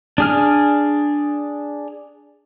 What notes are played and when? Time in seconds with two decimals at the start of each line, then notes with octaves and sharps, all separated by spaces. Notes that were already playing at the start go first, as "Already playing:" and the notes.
0.18 D4 G#4 F6